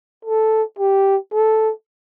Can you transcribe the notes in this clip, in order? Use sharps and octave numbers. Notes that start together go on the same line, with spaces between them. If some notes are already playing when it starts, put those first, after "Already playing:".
A4
G4
A4